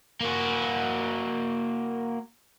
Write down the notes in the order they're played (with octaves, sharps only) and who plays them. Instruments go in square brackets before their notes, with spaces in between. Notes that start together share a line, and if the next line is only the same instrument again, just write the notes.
[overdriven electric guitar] A#3 F#4